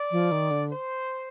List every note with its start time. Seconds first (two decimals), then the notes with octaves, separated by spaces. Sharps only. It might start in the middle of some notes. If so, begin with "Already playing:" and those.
Already playing: D5
0.11 F3
0.32 D#3
0.51 D3
0.71 C5